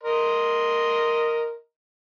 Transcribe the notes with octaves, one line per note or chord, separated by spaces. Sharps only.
A#4 D#5 C6